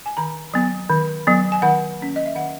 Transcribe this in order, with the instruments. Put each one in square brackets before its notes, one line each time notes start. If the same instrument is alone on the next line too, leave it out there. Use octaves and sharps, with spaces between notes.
[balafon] G#5
D#3 A#5
F#3 B3
D#3
F#3 B3
G#5
D#3 F#5
A#3 C#4
D#5
E5
D#3 F#5